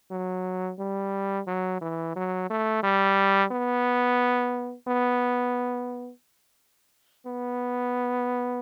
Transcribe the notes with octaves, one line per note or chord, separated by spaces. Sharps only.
F#3
G3
F#3
E3
F#3
A3
G3
B3
B3
B3